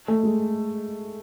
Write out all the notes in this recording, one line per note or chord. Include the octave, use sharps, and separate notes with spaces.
A3
G#3